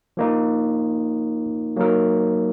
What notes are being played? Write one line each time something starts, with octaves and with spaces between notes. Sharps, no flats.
F3 A#3 D#4
F#3 A#3 D#4 A#4